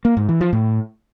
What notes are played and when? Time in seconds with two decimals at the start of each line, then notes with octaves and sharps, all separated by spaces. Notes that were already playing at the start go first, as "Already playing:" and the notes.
0.05 A#3
0.17 G#2
0.29 E3
0.41 F3
0.53 A2